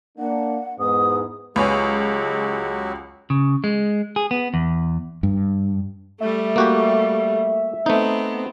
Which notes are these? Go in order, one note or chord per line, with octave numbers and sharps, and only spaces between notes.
A#3 D4 F#5
E2 G#2 B3 D#6
C#2 F#3 G#3 F#4 G4 B4 C#5 G#5
C#3
G#3
G#4
B3
E2
G2
G3 A3 E5
A#3 F#4 G4
A3 B3 C4 D#4